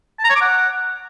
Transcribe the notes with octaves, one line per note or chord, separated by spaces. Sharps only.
A5
A#5
C#5
D6
F#5